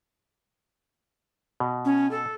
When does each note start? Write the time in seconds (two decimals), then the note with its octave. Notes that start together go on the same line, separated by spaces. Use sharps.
1.60 B2
1.85 C#4
2.11 A4